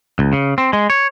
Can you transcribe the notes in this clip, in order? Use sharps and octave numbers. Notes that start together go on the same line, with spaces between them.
C#2
C#3
C4
G#3
C#5